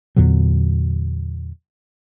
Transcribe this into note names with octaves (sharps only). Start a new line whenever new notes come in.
E2 A#2 D3 F#3